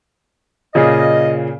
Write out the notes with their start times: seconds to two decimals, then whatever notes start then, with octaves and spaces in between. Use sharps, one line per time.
0.75 A#2 C#3 G#4 D#5